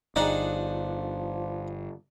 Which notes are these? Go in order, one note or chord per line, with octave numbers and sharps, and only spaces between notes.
G1 F3 D4 D#4 G#4 F#5